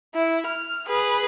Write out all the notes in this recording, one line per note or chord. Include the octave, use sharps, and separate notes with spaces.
E4
F6
G#4 B4